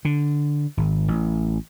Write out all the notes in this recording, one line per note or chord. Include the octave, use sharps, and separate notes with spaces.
D3
G#1
A1